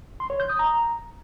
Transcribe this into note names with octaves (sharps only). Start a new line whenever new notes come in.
C6
C#5
G6
D#6
A#5